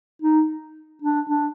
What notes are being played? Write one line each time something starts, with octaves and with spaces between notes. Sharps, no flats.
D#4
D4
D4